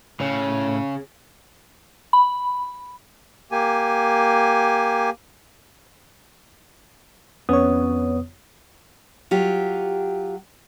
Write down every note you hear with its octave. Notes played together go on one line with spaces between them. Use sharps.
A2 C#3 C#5
B5
A#3 G4 G#5
F2 B3 C#4 C#5 D#6
F#3 F4 G4